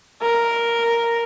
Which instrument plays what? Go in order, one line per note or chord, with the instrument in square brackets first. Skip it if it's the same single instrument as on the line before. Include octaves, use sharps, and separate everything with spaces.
[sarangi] A#4